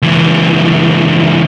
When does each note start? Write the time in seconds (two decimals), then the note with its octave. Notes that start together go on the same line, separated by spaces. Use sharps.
0.02 C#2 E3